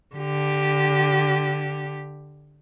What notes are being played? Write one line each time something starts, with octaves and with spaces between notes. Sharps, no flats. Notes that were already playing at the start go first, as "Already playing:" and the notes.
D3 G4